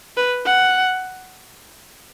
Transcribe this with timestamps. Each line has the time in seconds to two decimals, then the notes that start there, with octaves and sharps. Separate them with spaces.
0.17 B4
0.46 F#5